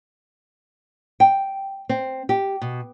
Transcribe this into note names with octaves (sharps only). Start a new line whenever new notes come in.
G5
C4
G4
B2